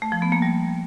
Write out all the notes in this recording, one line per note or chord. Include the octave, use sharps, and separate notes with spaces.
A3
F3
B3
A#3
G3